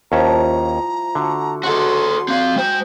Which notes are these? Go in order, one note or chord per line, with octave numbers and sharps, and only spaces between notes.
D#2 F3 G3 C#4 E4 A5 A#5
D3 A3 F#4 F#5
F#3 G#3 F#4 A4 C#5 C6
C4 D5 F5
G#3 C5 G5